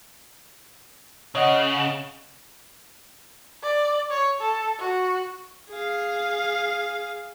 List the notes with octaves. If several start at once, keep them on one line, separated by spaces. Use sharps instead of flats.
C#3 C#5 D#5 F#5
D5
C#5
A4
F#4
G#4 F5